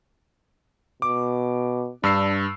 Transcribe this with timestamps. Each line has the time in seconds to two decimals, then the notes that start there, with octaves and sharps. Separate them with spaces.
1.02 B2 D6
2.03 G2 D4 E6 C7